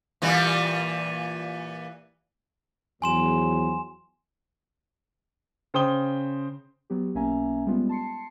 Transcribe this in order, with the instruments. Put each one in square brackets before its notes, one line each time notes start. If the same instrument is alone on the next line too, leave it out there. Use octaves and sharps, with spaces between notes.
[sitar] A#2 E3 G3
[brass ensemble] E2 F3 F#3 [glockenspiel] G#5 C6 E7
[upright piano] C#3 C5 G5 D#6 G7
[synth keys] F#3 B3 G4
B1 A#3 C#4 E5 G#5 A#5
G3 G#3 B3 F4
A5 C6 C7 C#7